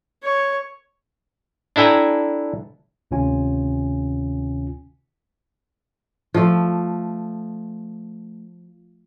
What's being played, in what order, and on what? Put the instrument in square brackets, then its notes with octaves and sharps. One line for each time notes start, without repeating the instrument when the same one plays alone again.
[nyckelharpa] C#5
[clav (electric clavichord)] D4 E4 A4 G5 G#5 A#5
[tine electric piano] D2 C3 D#3 C#4 F4 G#5
[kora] F3 A3